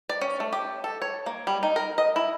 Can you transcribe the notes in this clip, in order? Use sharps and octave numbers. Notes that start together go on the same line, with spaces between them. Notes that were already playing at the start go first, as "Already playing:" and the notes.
D5
C#4
A3
G4
A4
C#5
A#3
G3
D#4
A#4
D#5
E4